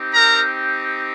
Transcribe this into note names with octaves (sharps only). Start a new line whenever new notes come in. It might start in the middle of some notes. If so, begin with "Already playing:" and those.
Already playing: C4 D#4 G4
A#4 A#5